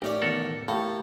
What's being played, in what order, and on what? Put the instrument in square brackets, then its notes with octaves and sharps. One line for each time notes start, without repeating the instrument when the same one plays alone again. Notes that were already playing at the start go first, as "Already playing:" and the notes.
[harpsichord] A1 C#4 D5 [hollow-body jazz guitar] A#3 D#4 G4
[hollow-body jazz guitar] E2 B2 D#3 [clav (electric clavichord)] A4 A#4 F#5
[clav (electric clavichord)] A2 [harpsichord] A#3 [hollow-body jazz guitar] G4 A4